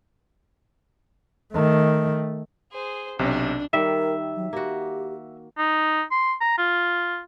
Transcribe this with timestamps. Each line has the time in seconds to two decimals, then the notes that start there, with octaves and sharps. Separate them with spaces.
1.53 D#3 A3
2.72 G#4 C5
3.19 B1 C3 D4
3.73 D#3 G3 A#4 E5
4.36 F#3
4.53 A#3 F#4 G4
5.58 D#4
6.11 C6
6.41 A#5
6.58 F4